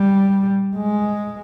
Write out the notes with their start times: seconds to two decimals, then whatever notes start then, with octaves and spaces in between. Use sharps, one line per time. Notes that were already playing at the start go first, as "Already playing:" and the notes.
Already playing: G3
0.77 G#3